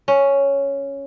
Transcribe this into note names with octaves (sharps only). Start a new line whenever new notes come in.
C#4